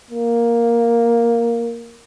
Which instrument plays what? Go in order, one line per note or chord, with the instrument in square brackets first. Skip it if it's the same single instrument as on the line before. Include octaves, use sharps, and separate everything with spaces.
[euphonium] A#3